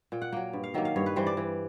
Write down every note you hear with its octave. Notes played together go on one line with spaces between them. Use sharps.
A#2 G5
F#5
F#3 A#3 G5
G2
F5
D#3 F#3 A#3 E5
F5
G2 C#5
B4
E3 G3 C5
D5
E3